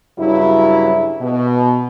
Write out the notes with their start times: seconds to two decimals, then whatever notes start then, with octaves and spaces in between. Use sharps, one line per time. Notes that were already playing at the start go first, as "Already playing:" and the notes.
0.19 G2 C#3 F#3 E4
1.21 B2